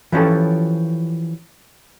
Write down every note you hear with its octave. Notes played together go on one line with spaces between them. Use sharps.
E3 F3 C#4 G4 A4